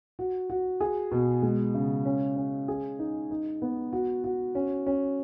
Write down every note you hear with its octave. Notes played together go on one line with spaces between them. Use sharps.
F#4
F#4
G#4
B2
G#3
C#3
C#4
C#4
G#4
D#4
D#4
B3
F#4
F#4
C#4
C#4